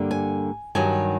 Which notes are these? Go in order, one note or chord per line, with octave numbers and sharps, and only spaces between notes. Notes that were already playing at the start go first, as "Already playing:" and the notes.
Already playing: G2 D3 G3 A#3
G#5
G2 D#3 F#3 G#5